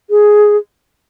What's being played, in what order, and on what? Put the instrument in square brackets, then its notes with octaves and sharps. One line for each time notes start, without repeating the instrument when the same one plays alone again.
[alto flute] G#4